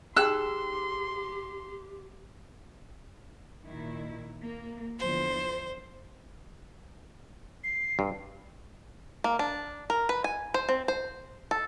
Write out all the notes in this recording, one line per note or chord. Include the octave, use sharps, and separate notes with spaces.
D#4 G4 G#4 G5 C6 E6 F#6
A#2 D#3 E4
A#3
E2 D3 F3 C5
C7
G2
A#3
D4
A#4
B4
G#5
C5
C4
C5
A4